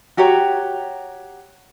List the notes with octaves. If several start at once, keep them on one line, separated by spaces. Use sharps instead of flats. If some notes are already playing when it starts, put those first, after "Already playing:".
F#4 G4 C#5 A#5